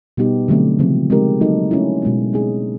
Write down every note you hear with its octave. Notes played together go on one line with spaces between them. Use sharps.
B2 G3 B3 D#4 G4
D3 F#3 A3 C4
C#3 F3 G#3 C4
G#3 C4 D#4 G4 A#4
F#3 A#3 D#4 F#4 A4
A3 C#4 E4
B2 G#3 B3
G#3 C4 D#4 G#4